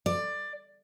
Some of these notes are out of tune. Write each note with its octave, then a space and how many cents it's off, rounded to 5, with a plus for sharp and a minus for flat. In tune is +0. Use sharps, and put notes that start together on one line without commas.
D5 +15